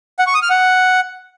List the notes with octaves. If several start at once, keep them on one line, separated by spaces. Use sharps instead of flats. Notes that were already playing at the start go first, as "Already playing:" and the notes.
F#5
C#6
D#6
F6
F#5